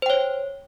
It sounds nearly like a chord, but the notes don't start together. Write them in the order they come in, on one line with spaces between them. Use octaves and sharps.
C5 G5 C#5